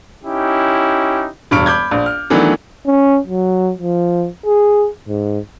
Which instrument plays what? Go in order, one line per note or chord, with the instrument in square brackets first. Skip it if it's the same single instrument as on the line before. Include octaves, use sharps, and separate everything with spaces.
[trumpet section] C#4 D#4 E4 G4
[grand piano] E1 G2 B5 C#6 F6 D7
B5 D6 G6 G#6
A#1
F6
D#3 E3 F#3 A3 B3 D4
[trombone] C#4
F#3
F3
G#4
G#2